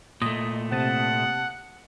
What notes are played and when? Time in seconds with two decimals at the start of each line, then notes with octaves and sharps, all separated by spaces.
0.22 A#2 A3 D#5
0.72 C3 F#5 A5 D#6